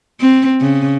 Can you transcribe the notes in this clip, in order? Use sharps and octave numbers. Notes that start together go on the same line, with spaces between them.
C4
C#3